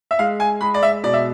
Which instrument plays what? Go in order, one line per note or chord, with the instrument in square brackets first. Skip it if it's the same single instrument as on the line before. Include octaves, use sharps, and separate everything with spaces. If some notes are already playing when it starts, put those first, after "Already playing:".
[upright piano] E5
G#3 F5
G#5
G#3 B5
D5
E5
B2 D5
E5